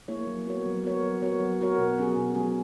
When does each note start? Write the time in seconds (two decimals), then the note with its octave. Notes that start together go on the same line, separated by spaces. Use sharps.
0.08 A#3 E4 G#4 C#5
0.27 F#3
0.46 B3 F#4 A#4 C#5
0.66 F#3
0.84 B3 F#4 A#4 C#5
1.03 F#3
1.22 B3 F#4 A#4 C#5
1.40 F#3
1.60 B3 F#4 A#4 C#5
1.78 B2
1.98 F#3 C#4 G#4
2.17 B2
2.35 F#3 C#4 G#4